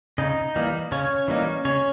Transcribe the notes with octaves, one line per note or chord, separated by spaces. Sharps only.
C#3 D#4 D#5
E3 G3 A#3 D#4
C#3 C#4 C#5
E3 G3 A#3 D#4
C#3 C#4 C#5